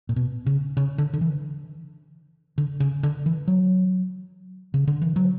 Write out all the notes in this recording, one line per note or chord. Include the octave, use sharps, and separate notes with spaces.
A#2
B2
C#3
C#3
D3
D3
E3
D3
C#3
D3
E3
F#3
C#3
D3
E3
F#3